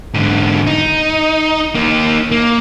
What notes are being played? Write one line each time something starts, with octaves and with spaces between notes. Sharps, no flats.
G#2 D3
D#4
A#3 D#4
A#3